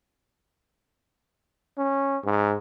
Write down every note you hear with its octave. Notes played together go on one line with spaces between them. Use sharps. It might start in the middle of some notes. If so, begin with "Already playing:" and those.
C#4
G#2